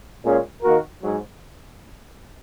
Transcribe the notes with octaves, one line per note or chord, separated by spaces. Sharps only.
A#2 G#3 C#4 G#4
D#3 A#3 F#4 A#4
G#2 F#3